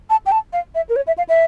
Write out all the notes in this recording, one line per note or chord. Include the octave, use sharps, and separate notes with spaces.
A5
G5
A5
F5
E5
A#4
C#5
E5
F5
E5